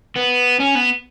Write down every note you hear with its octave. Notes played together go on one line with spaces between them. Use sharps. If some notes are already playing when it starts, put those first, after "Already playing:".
B3
C#4
B3